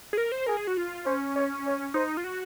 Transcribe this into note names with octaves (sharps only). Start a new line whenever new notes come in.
G#4
A#4
C5
G#4 A#4
G#4
F#4
F4
C#4 C5
C#5
C#5
D#4 C5
F4
F#4